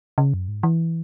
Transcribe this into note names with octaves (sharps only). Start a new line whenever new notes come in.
C#3
F#2
G#2
E3